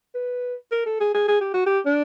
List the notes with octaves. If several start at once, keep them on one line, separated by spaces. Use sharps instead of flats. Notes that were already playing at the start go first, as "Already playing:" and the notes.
B4
A#4
A4
G#4
G#4
G#4
G4
F#4
G4
D4